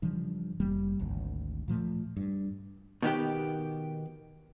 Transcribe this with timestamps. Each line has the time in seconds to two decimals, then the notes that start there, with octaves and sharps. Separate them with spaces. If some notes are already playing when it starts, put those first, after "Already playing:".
0.02 G2 C#3 E3 F3
0.60 F1 E3 G3 A#3
1.00 G#1 D2
1.68 A#2 F3 A3
2.17 G2
3.02 B2 D#3 B3 G4